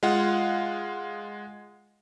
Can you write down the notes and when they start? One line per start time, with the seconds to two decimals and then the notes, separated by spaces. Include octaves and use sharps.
0.03 G#3 F4 F5 F#5